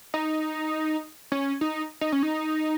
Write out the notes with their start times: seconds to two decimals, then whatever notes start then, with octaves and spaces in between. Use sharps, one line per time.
0.14 D#4
1.32 C#4
1.61 D#4
2.01 D#4
2.12 C#4
2.23 D#4